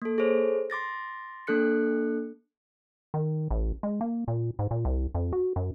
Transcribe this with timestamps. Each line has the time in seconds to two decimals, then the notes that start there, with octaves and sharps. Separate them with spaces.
0.02 A#3 A4
0.18 G#4 A4 C5 C#5
0.70 C6 D6 A6 A#6
1.47 A#3 D4 A4 F#6 C#7
3.14 D#3
3.51 A1
3.83 G#3
4.01 A#3
4.28 A#2
4.59 G#2
4.71 A#2
4.85 C2
5.15 F2
5.33 F#4
5.56 F#2